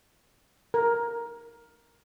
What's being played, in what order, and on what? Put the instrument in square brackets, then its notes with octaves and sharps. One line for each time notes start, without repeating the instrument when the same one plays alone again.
[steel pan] A#4